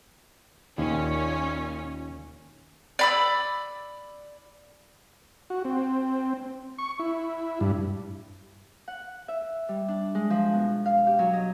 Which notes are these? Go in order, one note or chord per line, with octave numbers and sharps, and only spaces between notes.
D#2 A#2 C#4
D5 B5 E6
F#4
C4
C#6
E4
G2
F#5
E5
G3
D4
G#3
F3
B2
F5
G4
F#3
D#5